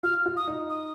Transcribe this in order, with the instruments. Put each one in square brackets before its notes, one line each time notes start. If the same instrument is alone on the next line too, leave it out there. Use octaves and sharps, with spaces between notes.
[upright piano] F4 [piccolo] F6
[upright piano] F4
[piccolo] D#6
[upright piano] D#4
[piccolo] D#6